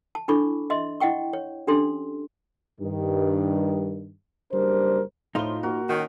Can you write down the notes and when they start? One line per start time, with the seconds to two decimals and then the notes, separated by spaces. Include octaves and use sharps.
0.15 A5
0.28 D4 E4 A4 B5 C#6 D6
0.70 D#5 E5 C6
1.00 E4 D#5 F#5 G5 C#6
1.33 C#5
1.67 C#4 D4 G4 A4 C6
2.80 G2 D#3
4.52 F#1 G3 D4 A#4 C5
5.35 A2 F3 D#4 F4 C5 C#5 G7
5.63 A#3 F#4 A#4
5.89 D#3 C#4 F#4 G5